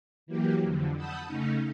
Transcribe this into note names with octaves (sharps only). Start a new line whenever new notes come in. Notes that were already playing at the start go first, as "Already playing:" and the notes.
E3 F#3 A#3 G4
F2 D3
F#5 A5 B5 D#6 E6 G6
C#3 A3 C#4 D#4